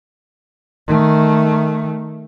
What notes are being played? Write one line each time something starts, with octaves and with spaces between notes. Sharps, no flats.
D#3 A3